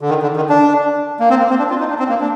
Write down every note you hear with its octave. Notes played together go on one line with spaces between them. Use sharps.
D3
D#3
D3
D#3
D4
A#3
C4
A#3
C4
D4
F4
D#4
D4
C4
A#3
D4